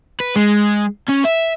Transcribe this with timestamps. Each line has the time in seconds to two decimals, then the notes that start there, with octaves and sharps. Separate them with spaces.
0.20 B4
0.36 G#3
1.09 C#4
1.25 E5